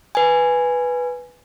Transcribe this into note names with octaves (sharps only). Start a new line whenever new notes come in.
B4 G#5